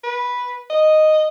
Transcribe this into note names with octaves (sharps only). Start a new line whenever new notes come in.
B4
D#5